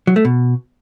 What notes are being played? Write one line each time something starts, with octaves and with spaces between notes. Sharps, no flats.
F#3
A3
B2